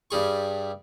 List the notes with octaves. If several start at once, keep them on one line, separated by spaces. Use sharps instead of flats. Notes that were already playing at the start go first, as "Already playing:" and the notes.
G2 G3 G#4 C#6